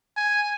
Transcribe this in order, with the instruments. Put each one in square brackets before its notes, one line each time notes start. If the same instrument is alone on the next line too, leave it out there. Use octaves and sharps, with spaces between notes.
[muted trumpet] G#5